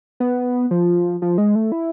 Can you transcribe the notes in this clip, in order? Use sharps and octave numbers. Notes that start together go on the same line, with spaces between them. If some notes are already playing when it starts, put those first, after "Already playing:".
B3
F3
F3
G#3
A3
E4